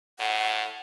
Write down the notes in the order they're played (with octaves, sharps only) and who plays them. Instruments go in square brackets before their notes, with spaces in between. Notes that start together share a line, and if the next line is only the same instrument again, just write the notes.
[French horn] A2 [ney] F#5